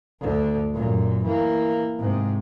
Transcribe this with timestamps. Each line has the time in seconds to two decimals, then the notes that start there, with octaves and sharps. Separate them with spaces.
0.20 D2 D3
0.73 F#2 A#2
1.23 E3 A#3
1.98 G#2 C3